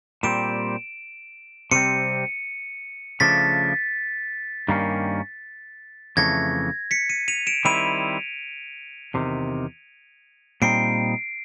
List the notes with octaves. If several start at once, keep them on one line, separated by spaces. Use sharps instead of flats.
A#2 G3 C4 D7 E7
C3 E3 G3 C4 C#7 D#7
C#3 F3 A3 D4 A6 B6
G2 D#3 G3 A#3 C#4
F2 C#3 E3 A3 G#6 A#6
B6 C#7
C#7 D#7
D#7 F7
D7 E7
D#3 G3 C4 E4 D#7 F7
E2 C3 D#3
A#2 G3 C4 D#4 C7 D7